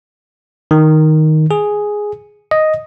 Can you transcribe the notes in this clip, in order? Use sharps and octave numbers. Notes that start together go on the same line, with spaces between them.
D#3
G#4
D#5